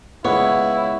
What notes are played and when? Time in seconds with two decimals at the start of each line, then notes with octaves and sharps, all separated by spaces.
0.25 C#2 B3 E4 B4 C#5